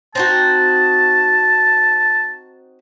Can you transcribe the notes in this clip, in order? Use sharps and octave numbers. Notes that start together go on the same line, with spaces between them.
C4 D#4 F#4 A5